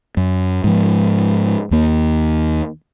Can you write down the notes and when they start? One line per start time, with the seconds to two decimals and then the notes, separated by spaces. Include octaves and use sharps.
0.17 F#2
0.64 G#2 F3
1.71 D#2 A#3